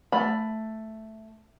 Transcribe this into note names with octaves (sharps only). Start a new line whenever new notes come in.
A3 B5